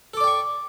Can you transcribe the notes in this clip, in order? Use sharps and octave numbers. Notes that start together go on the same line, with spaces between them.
A4 D5 G5 C#6 D6